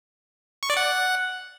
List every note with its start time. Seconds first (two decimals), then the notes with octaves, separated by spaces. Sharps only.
0.63 C#6
0.70 D5
0.77 F#5